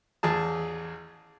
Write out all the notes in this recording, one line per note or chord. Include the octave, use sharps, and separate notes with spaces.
A1 E2 G#4 A5